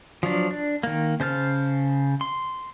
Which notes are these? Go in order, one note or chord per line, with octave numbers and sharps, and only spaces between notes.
F3 F#3 D4
D4
D#3 A#3
C#3 C5 A5 F6
C6